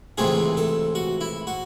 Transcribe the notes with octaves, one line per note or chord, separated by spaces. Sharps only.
C#2 C3 E3 A3 C4 G#4
A4
F#4
E4
F#4